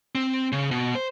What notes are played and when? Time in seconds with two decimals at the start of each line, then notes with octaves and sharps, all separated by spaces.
0.15 C4
0.52 C#3
0.71 B2
0.95 C5